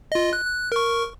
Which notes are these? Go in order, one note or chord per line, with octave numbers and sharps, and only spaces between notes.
F4 D#5
F#6
F#6
A#4 C#6